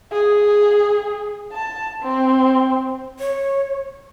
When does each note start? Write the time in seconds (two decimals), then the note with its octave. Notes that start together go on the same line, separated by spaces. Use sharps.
0.12 G#4
1.53 A5
2.02 C4
3.20 C#5